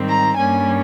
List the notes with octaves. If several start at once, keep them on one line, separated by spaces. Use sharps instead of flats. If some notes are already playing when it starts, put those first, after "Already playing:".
Already playing: G#2 D#3 G3 C4
A#5
G2 G3 A#3 C#4 G#5